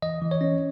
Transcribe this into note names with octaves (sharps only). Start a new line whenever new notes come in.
E3 D#5
E3
C#5
C#4